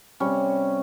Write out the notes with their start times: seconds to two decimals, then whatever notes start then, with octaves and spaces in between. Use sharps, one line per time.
0.20 C3 G3 C#4